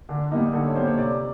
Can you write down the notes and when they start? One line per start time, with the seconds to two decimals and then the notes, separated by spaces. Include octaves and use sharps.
0.09 D3 D4
0.31 G3 A#3 D#4
0.53 D3 A4
0.65 C#5
0.75 G3 A#3 C5
0.87 C#5
0.98 C3 D5